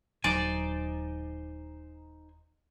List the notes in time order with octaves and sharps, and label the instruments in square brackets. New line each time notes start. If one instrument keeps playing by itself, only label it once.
[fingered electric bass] D#1 F#3 [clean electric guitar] D#4 C5 G#5 [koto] D5